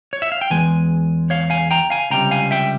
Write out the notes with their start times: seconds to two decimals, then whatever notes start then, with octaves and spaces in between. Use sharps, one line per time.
0.13 C#5
0.22 E5
0.32 F5
0.41 G5
0.50 E2 E3 G#3 G#5
1.30 C#5 F5
1.50 F5 G#5
1.71 G5 A#5
1.90 F5 G#5
2.10 C#2 C3 G3 G5 A#5
2.31 F5 G#5
2.51 E5 G5